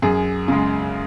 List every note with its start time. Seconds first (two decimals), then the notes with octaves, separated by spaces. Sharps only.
0.02 F#2 G#4
0.48 C#3 G#3